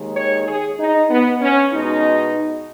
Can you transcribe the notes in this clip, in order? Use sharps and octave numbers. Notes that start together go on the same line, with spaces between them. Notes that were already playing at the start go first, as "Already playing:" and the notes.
Already playing: D#2 D#3 G#3
C#5
G#4
D#4
B3
C#4
B2 G#3 D#4